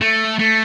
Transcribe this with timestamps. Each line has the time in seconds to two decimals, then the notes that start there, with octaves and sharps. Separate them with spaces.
0.01 A3
0.39 A3